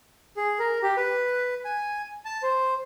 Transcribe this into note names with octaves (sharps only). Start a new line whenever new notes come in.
G#4
A#4
G4
B4
G#5
A5
C5